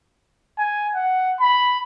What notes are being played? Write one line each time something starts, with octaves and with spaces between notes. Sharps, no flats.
G#5
F#5
B5